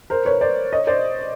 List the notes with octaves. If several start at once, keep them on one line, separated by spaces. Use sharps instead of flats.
A#4 C5
B4 C#5
C5 D5
C#5 D#5
C5 D5